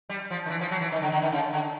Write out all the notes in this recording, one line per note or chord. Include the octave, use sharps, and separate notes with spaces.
G3
F3
D#3
E3
F3
F#3
E3
D#3
D3
D3
D#3
C#3
D3